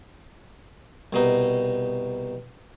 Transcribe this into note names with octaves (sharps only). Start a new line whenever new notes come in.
C2 B2 D#4